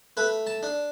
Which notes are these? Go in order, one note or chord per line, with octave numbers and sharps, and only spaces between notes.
A3 B4
A5
D4